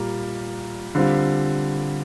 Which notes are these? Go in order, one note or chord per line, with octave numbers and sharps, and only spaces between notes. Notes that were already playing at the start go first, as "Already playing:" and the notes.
Already playing: A#2 G3 A#3
D3 G3 C4 F4